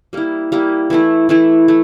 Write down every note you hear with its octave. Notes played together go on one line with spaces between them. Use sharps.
G3 A#3 E4
G3 A#3 E4
E3 A3 E4
E3 A3 E4
A3